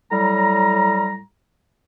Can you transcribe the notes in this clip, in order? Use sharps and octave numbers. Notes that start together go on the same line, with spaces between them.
A2 F#3 G3 A#5